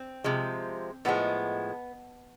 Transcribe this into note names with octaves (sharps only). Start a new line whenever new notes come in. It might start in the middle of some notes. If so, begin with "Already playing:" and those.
Already playing: C4
C3 F3 G#3
A2 F3 G#3 B3